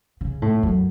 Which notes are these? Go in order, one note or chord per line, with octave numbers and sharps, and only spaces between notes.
C#3
A2
F#2